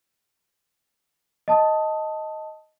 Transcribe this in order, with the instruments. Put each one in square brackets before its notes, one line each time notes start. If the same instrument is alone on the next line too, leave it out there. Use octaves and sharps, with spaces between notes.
[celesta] D#5 A5 D#6